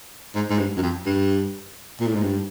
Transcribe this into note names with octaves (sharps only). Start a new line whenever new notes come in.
G#2
G#2
G2
F#2
F2
G2
A#2
A2
G#2
G2